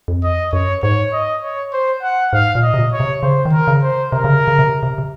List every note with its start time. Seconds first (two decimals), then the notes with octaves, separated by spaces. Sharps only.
0.08 F2
0.23 D#5
0.53 F#2 C#5
0.83 G#2 C#5
1.13 D#5
1.43 C#5
1.73 C5
2.02 F#5
2.33 G#2 F5
2.55 A#2
2.63 D#5
2.74 C3
2.78 A#2
2.92 C#5
3.00 C3
3.22 C#3 C5
3.45 D#3
3.52 A#4
3.68 C#3
3.82 C5
4.12 C3 A#4
4.24 C#3
4.36 C3
4.48 C#3
4.59 C3
4.71 C#3
4.83 C3
4.98 C3